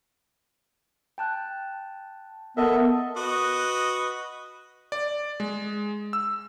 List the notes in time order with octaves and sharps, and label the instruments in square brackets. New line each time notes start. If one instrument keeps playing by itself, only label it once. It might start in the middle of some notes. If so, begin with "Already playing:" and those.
[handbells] G5 A5 F#6
[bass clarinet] B3 [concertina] A4 D#5 E5 [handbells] A#4
[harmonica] F#4 B4 D#5
[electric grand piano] D5
G#3
E6